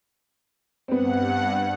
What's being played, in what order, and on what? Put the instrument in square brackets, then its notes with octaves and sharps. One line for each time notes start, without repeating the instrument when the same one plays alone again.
[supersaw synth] G2 F#5 [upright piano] B3 C4